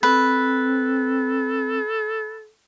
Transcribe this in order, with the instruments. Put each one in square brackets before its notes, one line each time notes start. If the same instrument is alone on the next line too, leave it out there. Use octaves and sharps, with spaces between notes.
[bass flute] C4 [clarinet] A4 [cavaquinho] B4